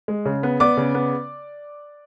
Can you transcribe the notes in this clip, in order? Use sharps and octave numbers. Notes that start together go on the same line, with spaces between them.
G#3
C#3
B3
B3 D5 D6
C#3
B3